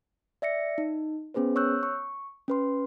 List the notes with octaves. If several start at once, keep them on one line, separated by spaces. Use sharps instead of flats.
D5 E5 A#6 C#7
D#4
B3 C#4 G#4 B4 C5
C#5 C#6 E6 F#6 G6
C#6
C#4 B4 C6